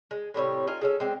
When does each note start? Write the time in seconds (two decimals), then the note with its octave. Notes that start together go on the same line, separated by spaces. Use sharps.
0.11 G#3
0.34 A2 C3 G3 C#5
0.67 D#4 F4 G#5
0.81 G#3 C#4 A4
1.00 G#3 C4 D4